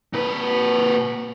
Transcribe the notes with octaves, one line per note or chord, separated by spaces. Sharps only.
A#2 B4